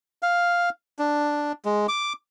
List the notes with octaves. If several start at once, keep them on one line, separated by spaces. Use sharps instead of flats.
F5
D4
G#3
D6